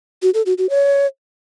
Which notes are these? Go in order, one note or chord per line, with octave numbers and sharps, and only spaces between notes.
F#4
A4
F#4
F#4
C#5